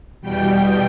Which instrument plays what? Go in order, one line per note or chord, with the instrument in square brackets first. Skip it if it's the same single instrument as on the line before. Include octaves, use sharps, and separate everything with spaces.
[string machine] E2 B2 G3 G5